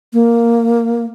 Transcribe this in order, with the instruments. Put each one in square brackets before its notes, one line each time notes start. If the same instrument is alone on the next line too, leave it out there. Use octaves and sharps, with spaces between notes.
[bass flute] A#3